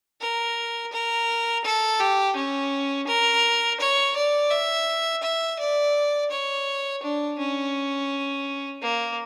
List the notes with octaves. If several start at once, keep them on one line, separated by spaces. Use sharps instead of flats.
A#4
A#4
A4
G4
C#4
A#4
C#5
D5
E5
E5
D5
C#5
D4
C#4
A#3